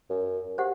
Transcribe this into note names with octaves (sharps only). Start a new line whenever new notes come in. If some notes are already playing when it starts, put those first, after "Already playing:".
F#2
G4 C5 F#5